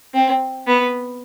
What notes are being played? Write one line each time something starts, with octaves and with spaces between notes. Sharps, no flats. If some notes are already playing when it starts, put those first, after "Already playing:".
C4
B3